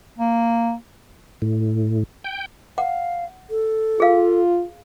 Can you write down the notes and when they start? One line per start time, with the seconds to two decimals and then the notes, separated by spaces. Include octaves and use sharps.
0.19 A#3
1.42 A2
2.24 G5
2.78 F5 F#5
3.50 A4
4.00 F4 G#4 F5